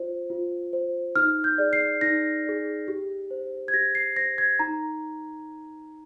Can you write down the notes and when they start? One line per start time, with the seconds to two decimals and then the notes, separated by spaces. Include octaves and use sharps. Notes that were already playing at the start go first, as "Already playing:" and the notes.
Already playing: F4 C5
0.30 F4
0.73 C5
1.16 D#4 F6
1.44 G6
1.58 G#4 D5
1.73 C7
2.01 D#4 A#6
2.44 G#4 D5
2.88 G4
3.31 C5
3.68 G#6
3.74 G4 A#6
3.95 C7
4.16 C5 A#6
4.38 G#6
4.59 D#4 A#5